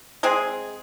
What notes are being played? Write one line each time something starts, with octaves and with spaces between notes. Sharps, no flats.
G#3 C4 G#4